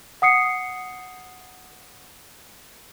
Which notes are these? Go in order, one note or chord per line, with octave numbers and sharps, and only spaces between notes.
F#5 D#6 C7 C#7